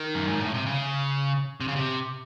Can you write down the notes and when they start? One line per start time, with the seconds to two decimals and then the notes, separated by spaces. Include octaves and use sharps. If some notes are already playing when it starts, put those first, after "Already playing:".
Already playing: D#3
0.15 F#2
0.28 G#2
0.41 A2
0.54 C3
0.66 C#3
1.61 C3
1.68 C#3
1.76 C3